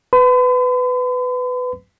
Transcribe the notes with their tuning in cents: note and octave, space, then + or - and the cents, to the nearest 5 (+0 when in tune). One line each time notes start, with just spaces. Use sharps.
B4 +15 B5 +45